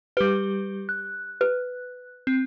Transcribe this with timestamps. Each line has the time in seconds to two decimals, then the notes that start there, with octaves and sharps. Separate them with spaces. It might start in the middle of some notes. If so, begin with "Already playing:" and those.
0.17 G3 G4 B4
0.89 F#6
1.41 B4
2.27 C4